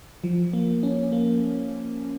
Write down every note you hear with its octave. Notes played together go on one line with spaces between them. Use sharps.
F3
A#3
C#4
A#3